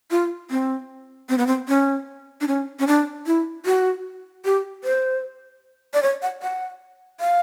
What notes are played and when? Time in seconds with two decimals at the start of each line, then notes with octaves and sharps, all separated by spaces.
0.11 F4
0.51 C4
1.29 C4
1.38 B3
1.47 C4
1.68 C#4
2.41 D4
2.48 C#4
2.79 C#4
2.87 D4
3.26 E4
3.66 F#4
4.45 G4
4.84 C5
5.94 D5
6.02 C#5
6.22 F#5
6.42 F#5
7.20 F5